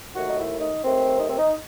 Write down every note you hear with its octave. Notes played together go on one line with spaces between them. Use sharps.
D#2 D#3 A3 F#4
D#4
E4
D#4
D#2 D#3 A3 C4
D#4
C4
D#4